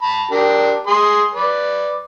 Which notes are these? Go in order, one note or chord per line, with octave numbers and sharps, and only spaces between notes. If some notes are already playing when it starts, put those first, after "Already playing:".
A5 B5
D4 G4 A#4
G#4 C6
B4 D5